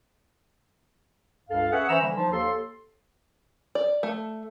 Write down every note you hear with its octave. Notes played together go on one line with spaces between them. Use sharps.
C#2 G2 A4 F5
C#4 G#4 B4 E5 F#5
E3 C#4 C5 E5 A#5 E6
D3 E3 G3 A#3
F3 D#4
D#2 A4 C6
D5
A3